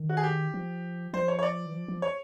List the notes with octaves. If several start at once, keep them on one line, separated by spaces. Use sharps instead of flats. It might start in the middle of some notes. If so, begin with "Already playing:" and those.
Already playing: D#3
F#4
G#4
G4
F3
F3 C5
C#5
C#5
D5
E3
F3
F3
C#5